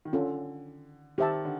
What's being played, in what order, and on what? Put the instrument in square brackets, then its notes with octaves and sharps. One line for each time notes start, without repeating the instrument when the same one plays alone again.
[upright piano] D#3
[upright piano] D3 [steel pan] C#4 F4 A4
[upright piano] D#3 [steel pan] G4 C5 E5 A5
[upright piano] D3